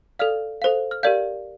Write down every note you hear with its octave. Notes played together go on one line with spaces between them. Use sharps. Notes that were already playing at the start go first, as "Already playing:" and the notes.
A4 D5 F5 F6
A4 C5 F5
F6
G4 A#4 D5 F5 G6